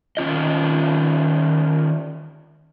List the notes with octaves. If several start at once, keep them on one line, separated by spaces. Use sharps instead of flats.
D#3 C#4 F4 D#5